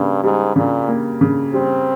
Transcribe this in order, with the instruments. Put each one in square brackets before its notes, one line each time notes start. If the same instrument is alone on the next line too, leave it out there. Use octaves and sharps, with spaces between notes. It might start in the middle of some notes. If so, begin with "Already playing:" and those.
Already playing: [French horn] G2 [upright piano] C#3 A#3
[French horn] G#2 [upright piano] G3
[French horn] A#2 [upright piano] C#3
[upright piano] A#3
C#3
[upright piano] G3 [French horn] C4